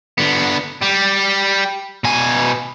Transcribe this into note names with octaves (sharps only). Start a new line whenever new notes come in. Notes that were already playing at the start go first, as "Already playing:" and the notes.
D3 B3
G3
B2 G#5